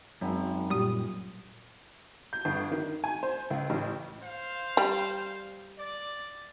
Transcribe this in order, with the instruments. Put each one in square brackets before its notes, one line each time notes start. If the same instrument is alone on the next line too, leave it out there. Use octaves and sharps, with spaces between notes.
[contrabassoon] G#1 [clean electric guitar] F#2
[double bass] A#2 [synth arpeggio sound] G3 D#6
[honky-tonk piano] G6
G1
D#3
G#5
C5
C#2
A1
[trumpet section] C5 F5
[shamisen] G3
[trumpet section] D5